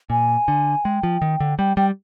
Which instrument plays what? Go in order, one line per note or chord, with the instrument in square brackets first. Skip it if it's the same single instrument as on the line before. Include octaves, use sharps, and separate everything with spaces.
[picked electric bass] A#2 [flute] G#5
[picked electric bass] D3
[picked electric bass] G#3 [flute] G5
[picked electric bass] F3
D#3
D3
[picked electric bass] G3 [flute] G5
[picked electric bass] G3 [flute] G5